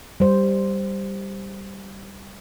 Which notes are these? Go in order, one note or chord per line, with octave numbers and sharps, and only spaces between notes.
G3 C5